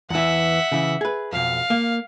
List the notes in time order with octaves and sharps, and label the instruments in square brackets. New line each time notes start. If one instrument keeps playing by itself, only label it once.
[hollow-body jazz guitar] E2 E3 [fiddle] E5 F#5
[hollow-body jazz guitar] C#3 E3
G#4 B4
[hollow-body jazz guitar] B1 F2 [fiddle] F5
[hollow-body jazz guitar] A#3